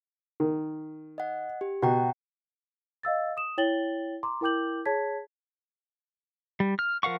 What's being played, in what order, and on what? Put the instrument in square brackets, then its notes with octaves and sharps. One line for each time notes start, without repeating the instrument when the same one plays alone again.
[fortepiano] D#3
[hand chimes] D#5 F#5
G4
[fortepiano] B2 [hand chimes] F#5 G5 A#5
[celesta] D#5 F5 E6 A6
D#6 E7
E4 C#5 G5 A6 F#7 G7
A#5 C6 D6
E4 A#4 G5 D6 G6 F#7
G#4 C#5 A5 G#6 B6
[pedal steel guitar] G3
F6
F3 A#4 F5 F#5 C#6